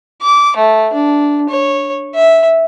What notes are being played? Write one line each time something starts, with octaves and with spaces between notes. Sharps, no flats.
D6
A3
D4
C#5
E5